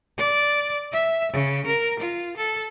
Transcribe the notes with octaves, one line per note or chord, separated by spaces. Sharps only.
D5
E5
C#3
A#4
F4
A4